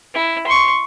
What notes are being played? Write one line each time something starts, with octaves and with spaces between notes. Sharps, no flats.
E4
C6 C#6